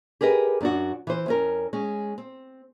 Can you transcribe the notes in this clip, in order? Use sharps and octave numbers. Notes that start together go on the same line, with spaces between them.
G4 G#4 A#4 B4 D#5
F#2 D4 F#4
E3 C5
F2 C#4 A#4
G#3 C#4
C4